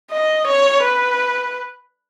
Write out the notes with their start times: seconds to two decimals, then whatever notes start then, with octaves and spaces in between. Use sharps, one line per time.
0.12 D#5
0.47 C#5
0.82 B4